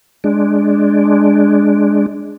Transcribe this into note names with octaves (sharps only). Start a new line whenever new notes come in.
G#3 D4